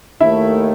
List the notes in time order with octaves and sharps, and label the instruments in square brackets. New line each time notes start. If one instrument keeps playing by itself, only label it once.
[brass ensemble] D#2 D#3 A3 [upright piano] E4 E5